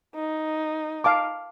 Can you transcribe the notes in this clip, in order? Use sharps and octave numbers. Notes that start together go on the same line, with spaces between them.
D#4
F5 A5 D6